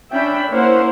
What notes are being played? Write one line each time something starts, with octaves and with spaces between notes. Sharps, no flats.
C#4 D4 E5 G5 B5
A#3 C#4 E4 C5 C#5 F#5